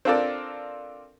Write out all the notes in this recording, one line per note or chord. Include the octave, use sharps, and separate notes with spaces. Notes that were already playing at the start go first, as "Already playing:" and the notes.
C4 D4 F4 A4 A#4 D5